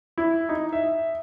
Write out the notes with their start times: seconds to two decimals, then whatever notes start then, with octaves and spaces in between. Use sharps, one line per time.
0.18 E4
0.49 D#4
0.73 E5